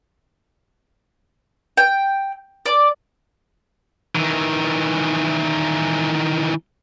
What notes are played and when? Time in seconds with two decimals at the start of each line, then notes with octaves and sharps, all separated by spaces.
1.77 G5
2.66 D5
4.15 D#3 E3